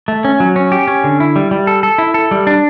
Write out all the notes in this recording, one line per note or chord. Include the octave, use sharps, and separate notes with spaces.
A3
C#4
F#3
C#4
G4
C#4
D3
E4
G3
G3
A4
A4
E4
A4
G3
D4